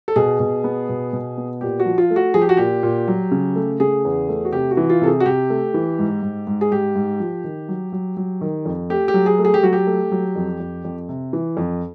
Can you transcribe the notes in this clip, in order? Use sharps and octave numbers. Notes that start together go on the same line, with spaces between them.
A4
B2 G#4
B2
B3
B2
B2
B3
A#2 G4
F#4
F3
F4
A3
F#4
F3 G#4
G4
F#4
A#2 G4
A#2
F#3
C#3
A3
C#3 G#4
E2
A3
F#4
C3 G4
F#4
E3
F4
C3 A4
G#4
F#4
C3 G4
A3
E3
G#2
G#2
G#2
G#4
G#2 G4
G#2
F3
D#3
F#3
F#3
F#3
D#3
F2
A3 G4
G4
F#3
G#4
A3
G#4
G4
F#3 F#4
G4
A3
F#3
F2
F2
F2
C3
E3
F2